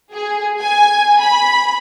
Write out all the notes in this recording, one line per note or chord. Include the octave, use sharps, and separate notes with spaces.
G#4
G#5
B5